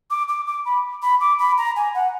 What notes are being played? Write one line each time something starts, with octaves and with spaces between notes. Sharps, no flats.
D6
D6
D6
B5
B5
D6
B5
A#5
G#5
F#5